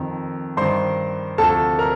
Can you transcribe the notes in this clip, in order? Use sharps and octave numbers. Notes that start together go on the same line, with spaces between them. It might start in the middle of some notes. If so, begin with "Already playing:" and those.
Already playing: F2 D#3
G2 D#3 C5 C6
D2 C3 F3 A4 A5
A#4 A#5